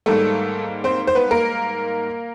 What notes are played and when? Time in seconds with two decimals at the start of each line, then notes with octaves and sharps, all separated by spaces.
0.06 G#2 D#3 G3 A3 A#3 A4
0.84 C4 C5
1.07 C5
1.15 B3 B4
1.31 A#3 A#4